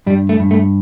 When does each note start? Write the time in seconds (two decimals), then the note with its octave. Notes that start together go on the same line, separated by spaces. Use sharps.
0.07 G2 G3
0.29 A3
0.40 G2
0.51 A3